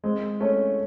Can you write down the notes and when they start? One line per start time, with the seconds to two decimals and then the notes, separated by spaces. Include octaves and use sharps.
0.04 G#3 C4
0.40 A3 C#4